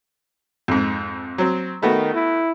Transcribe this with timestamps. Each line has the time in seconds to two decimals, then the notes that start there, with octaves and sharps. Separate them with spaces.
0.68 F2 G#2
1.38 F#3 C4
1.83 D#3 A3 B3 F#4
2.14 E4